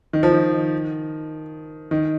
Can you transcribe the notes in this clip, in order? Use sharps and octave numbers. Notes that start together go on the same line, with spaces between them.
D#3
F3
D#3
D#3